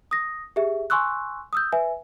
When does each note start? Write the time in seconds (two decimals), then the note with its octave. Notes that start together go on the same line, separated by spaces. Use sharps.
0.11 D#6 A#6
0.56 G4 G#4 E5
0.90 G#5 C6 C#6 E6 F#6
1.53 D#6 E6 G6
1.72 B4 E5 G#5